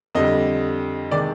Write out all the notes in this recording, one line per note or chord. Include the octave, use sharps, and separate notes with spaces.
F2 D3 G3 D#5
C3 D#3 G#3 D5